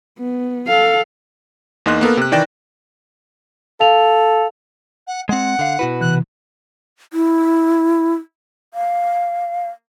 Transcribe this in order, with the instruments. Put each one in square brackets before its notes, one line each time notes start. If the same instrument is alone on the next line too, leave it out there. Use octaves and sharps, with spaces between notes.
[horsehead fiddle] B3
A4 F5
[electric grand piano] E2 A#3 D#4 D#5 C6 F#6
A#3 B3 A4 A#4
C3 F#6
D#3 E3 D5 G5 A#6 E7
[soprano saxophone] A4 [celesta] F5 F7
[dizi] F#5
[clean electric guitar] G#3 C4 [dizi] F#5
[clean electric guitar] D3 F5
[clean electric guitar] B2 F#4 B4 [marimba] E4
[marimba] C3 E3 [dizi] F#6
[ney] E4
F5